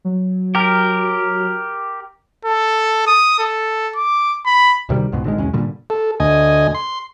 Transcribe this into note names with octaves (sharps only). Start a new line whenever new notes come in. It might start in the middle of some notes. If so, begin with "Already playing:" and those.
F#3
G4 A#4
A4
D#6
A4
D6
B5
D2 C3 D#3 G3
C#2 G#2 B2
G#1 D3 D#3 G#3
B1 E2 G#3 C#4
G2 A#2 D3 G3
A4
D2 D#5 G#5
C6